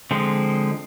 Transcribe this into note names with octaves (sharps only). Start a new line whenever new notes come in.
D3 F3 G#3 C4